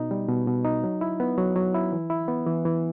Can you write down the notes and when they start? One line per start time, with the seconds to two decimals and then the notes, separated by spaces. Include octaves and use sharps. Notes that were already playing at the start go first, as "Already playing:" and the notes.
Already playing: B2 D#4
0.11 G3
0.28 B2
0.47 B2
0.65 D#4
0.84 F#3
1.01 E4
1.20 B3
1.38 F#3
1.55 F#3
1.74 E4
1.93 E3
2.10 E4
2.28 B3
2.46 E3
2.65 E3